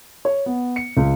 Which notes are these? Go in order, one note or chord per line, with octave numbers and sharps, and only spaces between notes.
C#5
B3
C#7
C#2